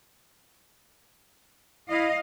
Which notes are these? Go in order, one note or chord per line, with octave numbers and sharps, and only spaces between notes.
E4 D#5 F5